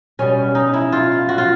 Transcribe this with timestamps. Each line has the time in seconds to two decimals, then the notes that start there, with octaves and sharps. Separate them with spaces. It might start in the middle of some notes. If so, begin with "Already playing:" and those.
0.19 B2 G3 C#4
0.55 D#4
0.74 E4
0.92 F4
1.29 F#4
1.38 F4